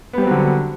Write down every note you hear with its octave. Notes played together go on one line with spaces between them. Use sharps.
D3 F#3 G3 B3 C4